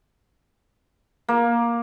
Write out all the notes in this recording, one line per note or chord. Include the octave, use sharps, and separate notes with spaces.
A#3